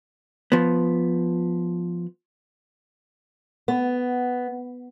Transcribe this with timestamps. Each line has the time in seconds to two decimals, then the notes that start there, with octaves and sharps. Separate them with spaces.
0.52 F3 B3
3.68 B3